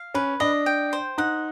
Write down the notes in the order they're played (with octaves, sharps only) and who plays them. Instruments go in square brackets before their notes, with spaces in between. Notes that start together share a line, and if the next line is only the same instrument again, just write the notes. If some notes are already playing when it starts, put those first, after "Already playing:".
Already playing: [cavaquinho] F5
[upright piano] C#4 [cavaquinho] B4
[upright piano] D4 [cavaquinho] D#5
[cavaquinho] G5
C5
[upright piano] D#4 [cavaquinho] F#5